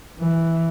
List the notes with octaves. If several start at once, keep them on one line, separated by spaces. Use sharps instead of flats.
E3